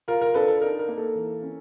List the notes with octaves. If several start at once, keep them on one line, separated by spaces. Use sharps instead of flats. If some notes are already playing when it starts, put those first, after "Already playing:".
F4 A#4
A#4
D4 A4 B4
A4
D#4 A#4
A#4
A#3
A4
E3
C#4